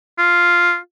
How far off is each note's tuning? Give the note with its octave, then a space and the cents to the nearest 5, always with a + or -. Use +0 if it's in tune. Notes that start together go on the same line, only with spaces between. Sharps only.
F4 +0